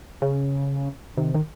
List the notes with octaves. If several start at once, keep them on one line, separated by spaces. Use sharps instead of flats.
C#3
C3 D#3
D#3